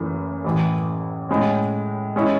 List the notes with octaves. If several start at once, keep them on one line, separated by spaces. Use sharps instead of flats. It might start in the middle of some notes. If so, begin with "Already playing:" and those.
Already playing: F#1 F#2 E3 A3
A1 A2 E3
A2 G#3 C#4
G#3 C#4 E4